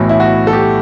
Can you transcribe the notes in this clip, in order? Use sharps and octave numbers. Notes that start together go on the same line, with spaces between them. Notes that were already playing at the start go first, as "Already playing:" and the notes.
Already playing: B1 A2 E3
E4
F#4
A4
G4